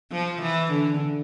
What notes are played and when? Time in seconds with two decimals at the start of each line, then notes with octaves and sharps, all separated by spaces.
0.12 F3
0.42 E3
0.72 D3